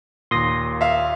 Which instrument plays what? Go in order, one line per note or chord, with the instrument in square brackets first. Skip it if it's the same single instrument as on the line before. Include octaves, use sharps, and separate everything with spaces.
[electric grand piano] D#2 A#2 [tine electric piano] C6 D#6 A#6
[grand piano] E5 F5